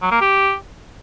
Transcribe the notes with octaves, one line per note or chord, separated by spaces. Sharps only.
F#3
A#3
G4